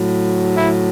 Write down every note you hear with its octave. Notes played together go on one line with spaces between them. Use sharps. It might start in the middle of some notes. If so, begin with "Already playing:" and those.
Already playing: A2 F#3
E4